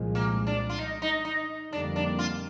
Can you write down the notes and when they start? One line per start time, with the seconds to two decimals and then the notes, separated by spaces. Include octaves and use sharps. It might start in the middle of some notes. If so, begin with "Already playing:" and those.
Already playing: C2 A#2 F3 G#3
0.15 A#3
0.47 D4
0.69 F4
0.78 D#4
1.02 D#4
1.25 D#4
1.72 F2 D3 G3 A#3 D4
1.96 D4
2.19 F4